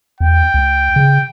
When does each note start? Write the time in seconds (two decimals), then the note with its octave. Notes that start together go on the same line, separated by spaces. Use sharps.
0.20 E2 G5
0.54 C#2
0.96 C#3